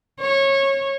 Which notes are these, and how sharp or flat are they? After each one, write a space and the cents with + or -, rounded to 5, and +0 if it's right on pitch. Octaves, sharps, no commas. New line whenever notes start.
C#5 -20